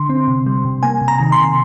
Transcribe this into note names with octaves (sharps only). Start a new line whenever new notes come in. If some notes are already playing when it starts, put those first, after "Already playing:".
Already playing: D3 C6
C4
C3
G3
C3
A#3 G#5
C3
A#5
D#3
C6
C3